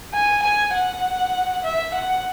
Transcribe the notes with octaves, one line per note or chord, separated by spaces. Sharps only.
G#5
G#5
F#5
E5
F#5